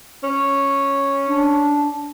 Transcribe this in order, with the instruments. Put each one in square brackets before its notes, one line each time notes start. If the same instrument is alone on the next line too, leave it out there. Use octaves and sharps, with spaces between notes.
[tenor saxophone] C#4
[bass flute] D4